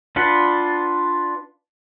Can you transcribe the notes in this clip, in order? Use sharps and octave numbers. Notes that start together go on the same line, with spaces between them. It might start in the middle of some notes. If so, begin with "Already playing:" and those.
D4 F4 B4 F#5